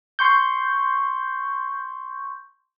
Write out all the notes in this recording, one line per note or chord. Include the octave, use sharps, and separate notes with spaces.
C6 C#6 G6